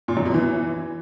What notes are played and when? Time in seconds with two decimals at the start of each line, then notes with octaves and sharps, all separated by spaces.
0.08 A#2
0.17 F#2
0.25 B2
0.34 E3